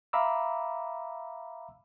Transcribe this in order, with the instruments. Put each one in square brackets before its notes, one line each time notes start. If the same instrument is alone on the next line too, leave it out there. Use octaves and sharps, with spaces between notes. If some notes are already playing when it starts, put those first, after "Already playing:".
[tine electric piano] E5 F5 A#5 B5 D6 E6